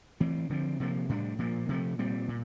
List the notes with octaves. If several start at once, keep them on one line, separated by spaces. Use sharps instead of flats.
E3 A3 C4
D3 F3 C4
C3 F3 A#3
A2 G3 D4
A#2 F3 A#3
C3 F3 A3
A#2 G3 C4
A#2